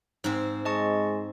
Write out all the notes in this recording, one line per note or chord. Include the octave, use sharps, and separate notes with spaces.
G#2 C4
G#3 D#5 A5 C#6